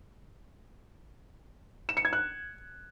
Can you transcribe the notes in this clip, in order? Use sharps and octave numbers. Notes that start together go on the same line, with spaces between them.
E7
C#7
G#6
F#6